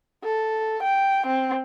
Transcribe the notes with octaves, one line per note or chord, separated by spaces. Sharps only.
A4
G5
C4